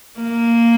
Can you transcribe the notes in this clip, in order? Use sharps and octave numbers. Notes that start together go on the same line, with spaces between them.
A#3